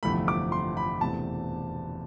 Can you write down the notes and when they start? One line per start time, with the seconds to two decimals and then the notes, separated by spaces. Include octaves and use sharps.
0.03 G1 F2 C3 E3 A3 B5
0.28 D6
0.52 C6
0.77 B5
1.01 E1 E2 C3 E3 A3 A5